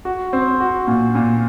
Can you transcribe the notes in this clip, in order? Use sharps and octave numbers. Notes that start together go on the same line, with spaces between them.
F#4
C4
F#4
A#2
A#2